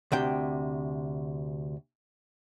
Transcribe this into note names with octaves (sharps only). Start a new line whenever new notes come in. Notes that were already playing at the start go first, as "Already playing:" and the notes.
D2 C3 G5